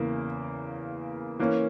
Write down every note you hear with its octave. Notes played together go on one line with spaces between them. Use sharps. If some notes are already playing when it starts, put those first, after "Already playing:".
Already playing: E2 C#3 E3 A#3
E3 A#3 C#4